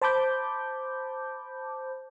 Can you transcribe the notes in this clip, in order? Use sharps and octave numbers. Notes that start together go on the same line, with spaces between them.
C5 A5 B5 D6 G6